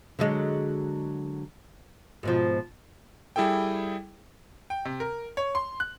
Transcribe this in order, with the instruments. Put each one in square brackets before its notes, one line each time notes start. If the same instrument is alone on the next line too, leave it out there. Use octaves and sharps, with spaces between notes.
[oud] D3 F#3 G#3
G#2 B2 F3
[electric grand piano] G3 E4 G#4 A4 G5
[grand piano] G5
C3
A#4
C#5
C6
F#6